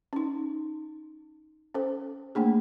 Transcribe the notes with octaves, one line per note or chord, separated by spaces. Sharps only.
C#4 D#4
C#4 A4 C5
A3 A#3 D4 G#4